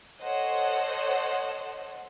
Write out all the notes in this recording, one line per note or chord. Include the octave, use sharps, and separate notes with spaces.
A4 C5 C#5 D#5 F#5